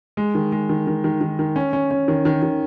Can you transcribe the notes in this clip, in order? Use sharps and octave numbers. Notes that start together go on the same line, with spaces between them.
G#3
D#3
G#3
D#3
D#3
D#3
D#3
D#3
C#4
C#4
C#4
D#3
D#3
D#3